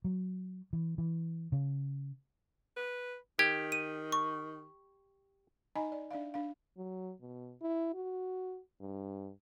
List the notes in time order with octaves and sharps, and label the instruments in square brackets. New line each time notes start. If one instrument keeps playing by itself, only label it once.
[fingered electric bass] F#3
E3
E3
C#3
[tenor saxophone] B4
[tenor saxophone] D#3 [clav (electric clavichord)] G4 [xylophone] G#6
[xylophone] D#7
C#6
[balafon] D#4 D#5 G#5 A#5 B5
D5
D4 D5 E5 F5
D4 F5
[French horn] F#3
B2
E4
F#4
G2